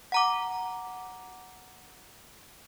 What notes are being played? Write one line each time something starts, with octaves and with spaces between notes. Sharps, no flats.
F#5 A#5 D6